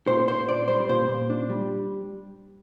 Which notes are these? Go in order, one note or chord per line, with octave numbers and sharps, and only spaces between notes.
A#2 C5
A#2 C5
D4 D5
G3 C5
A#2 C5
A#2
D4
G3